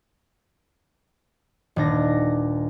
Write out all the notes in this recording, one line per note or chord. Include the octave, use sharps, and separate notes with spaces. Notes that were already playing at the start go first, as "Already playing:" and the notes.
D#1 D4 A#6